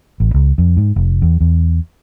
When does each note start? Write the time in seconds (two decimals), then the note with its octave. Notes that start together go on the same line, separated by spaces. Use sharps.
0.20 A1
0.34 C#2
0.58 F2
0.77 G#2
0.96 F1
1.22 E2
1.41 E2